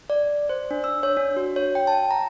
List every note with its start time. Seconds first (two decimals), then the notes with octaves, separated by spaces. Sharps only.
0.10 D5
0.49 C5
0.71 D4
0.84 E6
1.03 C#5
1.17 D4
1.36 F#4
1.56 C#5
1.75 G5
1.87 A5
2.11 A#5